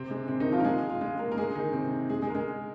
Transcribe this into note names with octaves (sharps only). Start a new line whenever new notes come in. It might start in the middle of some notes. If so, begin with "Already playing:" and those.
Already playing: C3 C4
G#3
C3 C4
D#3 D#4
F3 F4
A#4
G#3 G#4
F4
G#3 G#4
A#3 A#4
A#4
G#3 G#4
D#3 D#4
C3 C4
G#3 G#4
G#3 G#4
A#4
G#3 G#4